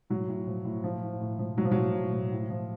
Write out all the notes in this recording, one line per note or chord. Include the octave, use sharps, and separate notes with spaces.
A2 F#3
A2
F3
A2
A2 F3
A2
A2
F3
A2 F#3
F3
A2 F#3
A2
F3
A2
F3